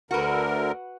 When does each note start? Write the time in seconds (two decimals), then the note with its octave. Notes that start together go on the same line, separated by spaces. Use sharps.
0.11 D2 D3 F#4 A#4 B4